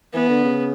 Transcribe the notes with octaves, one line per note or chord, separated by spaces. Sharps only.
E3 B3
D3
C#3